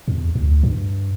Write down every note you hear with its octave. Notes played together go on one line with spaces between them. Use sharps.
E2
D2
G2